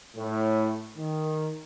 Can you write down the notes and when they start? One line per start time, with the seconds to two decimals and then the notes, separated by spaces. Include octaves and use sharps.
0.16 A2
0.97 D#3